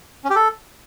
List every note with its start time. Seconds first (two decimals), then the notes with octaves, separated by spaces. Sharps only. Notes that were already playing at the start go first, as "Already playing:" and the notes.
0.24 C#4
0.30 G4
0.36 A4